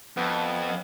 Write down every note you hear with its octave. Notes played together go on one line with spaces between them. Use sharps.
F2 B3